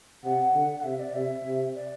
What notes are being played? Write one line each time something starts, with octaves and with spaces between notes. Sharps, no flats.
C3 F#5
D3
F#5
C3 E5
D5
C3 E5
C3
D5